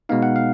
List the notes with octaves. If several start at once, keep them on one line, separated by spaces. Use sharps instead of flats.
B2 G#3 B3 D#4 F5
F#5
F5